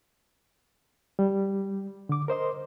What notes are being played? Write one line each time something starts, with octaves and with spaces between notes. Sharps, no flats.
G3
D3 D6
A#4 C5 D#5 C6